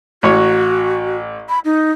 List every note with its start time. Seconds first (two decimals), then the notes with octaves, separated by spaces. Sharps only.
0.23 A1 F#4 C#5
1.49 B5
1.65 D#4